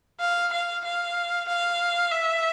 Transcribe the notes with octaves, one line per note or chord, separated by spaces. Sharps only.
F5
F5
F5
F5
E5